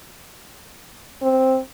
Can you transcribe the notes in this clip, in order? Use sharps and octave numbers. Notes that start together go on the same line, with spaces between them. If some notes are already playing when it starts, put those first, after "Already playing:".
C4